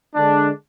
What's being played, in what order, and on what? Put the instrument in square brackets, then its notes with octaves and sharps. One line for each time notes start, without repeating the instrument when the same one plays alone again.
[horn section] D3 G#3 D4